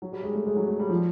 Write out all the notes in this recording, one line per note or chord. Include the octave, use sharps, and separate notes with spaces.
F#3
G3
G#3
A3
G#3
F#3
A3
G3
F3